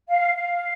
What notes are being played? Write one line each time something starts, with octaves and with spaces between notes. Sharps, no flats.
F5
F5